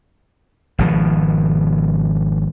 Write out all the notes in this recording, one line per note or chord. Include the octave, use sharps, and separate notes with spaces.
G#1 B2 F3